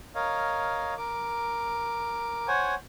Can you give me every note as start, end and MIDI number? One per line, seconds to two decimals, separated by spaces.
0.15 0.94 70
0.15 0.94 73
0.15 0.94 75
0.15 0.94 77
0.97 2.47 70
0.97 2.47 86
2.48 2.75 72
2.48 2.75 73
2.48 2.75 78
2.48 2.75 80